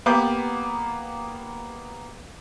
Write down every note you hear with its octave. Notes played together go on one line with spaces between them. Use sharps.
A#3 B3 G4 B5 D6 G6